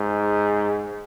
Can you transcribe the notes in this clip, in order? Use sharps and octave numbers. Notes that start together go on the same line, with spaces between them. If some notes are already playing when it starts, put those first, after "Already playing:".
Already playing: G#2